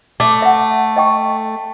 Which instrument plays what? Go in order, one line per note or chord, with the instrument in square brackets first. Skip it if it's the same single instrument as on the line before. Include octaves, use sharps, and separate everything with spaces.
[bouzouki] A3 [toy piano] D6
[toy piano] E5 F#5
D#5 G5 C#6